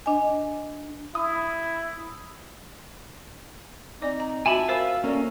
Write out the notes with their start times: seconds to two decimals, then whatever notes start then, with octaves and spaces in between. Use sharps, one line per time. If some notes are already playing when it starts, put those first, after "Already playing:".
0.06 D4 D#5 G#5
1.15 E4 D#6
4.02 C4 D#4 D5 D6
4.20 A#5
4.46 F4 F#4 E5 G#5 A5 B5
4.68 A#4 C5 F5 E6
5.04 A#3 C#4 D4 A4 A#4 D5